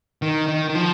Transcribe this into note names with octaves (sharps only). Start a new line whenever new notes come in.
D#3
D#3
D#3
F3